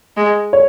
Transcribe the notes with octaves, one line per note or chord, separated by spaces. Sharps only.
G#3
C#5